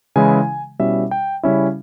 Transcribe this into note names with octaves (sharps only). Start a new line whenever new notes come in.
C#3 E3 G#3 C#4 E4 G#5
B2 G3 C#4 E4 E5
G5
C#3 G3 C#4 E4 E5